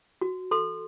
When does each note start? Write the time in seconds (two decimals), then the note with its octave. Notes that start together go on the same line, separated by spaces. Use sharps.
0.21 F#4
0.51 A4 C6